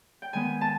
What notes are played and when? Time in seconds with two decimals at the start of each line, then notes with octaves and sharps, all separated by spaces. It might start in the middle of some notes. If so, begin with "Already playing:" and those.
0.22 G5
0.33 D#3 G#3 B3 G#5
0.61 A5